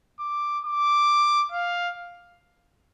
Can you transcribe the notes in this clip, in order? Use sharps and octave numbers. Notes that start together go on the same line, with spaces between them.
D6
D6
F5